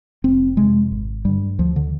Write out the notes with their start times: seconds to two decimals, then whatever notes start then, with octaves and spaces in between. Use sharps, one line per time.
0.24 F1 C4
0.57 F2 C3 G#3
0.92 G#1
1.25 G2 D3 G3
1.59 D2 F3
1.76 D3